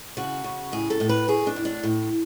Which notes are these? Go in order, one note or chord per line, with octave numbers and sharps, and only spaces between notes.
C#3 F#4
C#3
A2 G#4
A4
A2
B4
A2 G#4
D4
A2
D4
A2